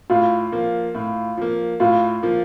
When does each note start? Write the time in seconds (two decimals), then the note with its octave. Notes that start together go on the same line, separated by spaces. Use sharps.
0.10 A2 F4
0.52 F3 A#3
0.95 A2
1.37 F3 A#3
1.80 A2 F4
2.23 F3 A#3